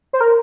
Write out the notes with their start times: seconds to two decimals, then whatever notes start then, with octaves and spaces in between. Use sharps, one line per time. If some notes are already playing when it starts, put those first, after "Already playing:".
0.13 C5
0.21 A#4